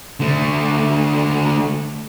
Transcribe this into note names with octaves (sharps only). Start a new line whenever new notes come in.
D3 A3